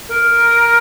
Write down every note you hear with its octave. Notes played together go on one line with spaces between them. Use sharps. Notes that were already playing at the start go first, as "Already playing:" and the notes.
A#4